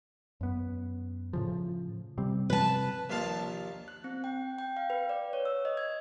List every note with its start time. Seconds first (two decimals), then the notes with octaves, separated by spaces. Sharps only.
0.41 F#2 B3
1.33 A2 C#3 F3
2.18 C3 G3 C4
2.50 B4 A5
3.10 A#1 D#2 F4 F5 A5
3.88 F#6
4.04 C4
4.24 G5
4.59 G5
4.77 F5
4.90 B4
5.09 D5
5.33 C#5
5.45 E6
5.65 D#5
5.77 G#6